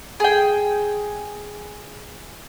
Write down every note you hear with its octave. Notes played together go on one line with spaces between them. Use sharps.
G#4 G5